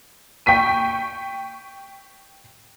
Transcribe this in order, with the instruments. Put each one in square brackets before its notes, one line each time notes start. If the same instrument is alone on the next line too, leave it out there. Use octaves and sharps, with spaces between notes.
[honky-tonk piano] G5 C#6 B6 D#7